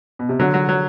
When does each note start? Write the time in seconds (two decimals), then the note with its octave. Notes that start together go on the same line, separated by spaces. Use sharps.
0.19 B2
0.29 C3
0.39 D3 F#3
0.54 F#3
0.69 F#3